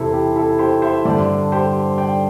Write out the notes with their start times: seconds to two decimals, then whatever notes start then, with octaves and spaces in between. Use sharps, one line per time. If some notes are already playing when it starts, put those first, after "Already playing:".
Already playing: E2 C3 E3 E4 G4 A4 C5
0.13 G4
0.36 E4 A4
0.59 G4 C5
0.82 C5 E5
1.05 G2 D3 A4 D5
1.52 G4 C5
1.98 D5 G5